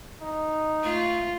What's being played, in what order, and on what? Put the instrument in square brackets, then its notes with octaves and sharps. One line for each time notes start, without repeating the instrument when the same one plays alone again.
[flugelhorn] D#4
[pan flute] A3 [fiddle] F4